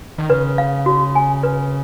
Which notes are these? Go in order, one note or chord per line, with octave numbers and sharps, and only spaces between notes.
D#3
C#3 B4
F5
F#4
G#5
B4